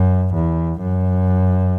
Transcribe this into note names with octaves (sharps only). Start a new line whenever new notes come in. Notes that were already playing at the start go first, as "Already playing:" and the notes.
Already playing: F#2
E2
F#2